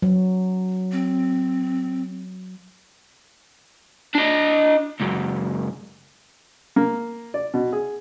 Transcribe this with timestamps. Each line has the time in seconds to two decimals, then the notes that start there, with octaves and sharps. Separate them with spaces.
0.02 F#3
0.92 C4
4.15 D4 D#5
5.00 C#2 F#2
6.76 A#3
7.34 D5
7.54 B2
7.73 G#4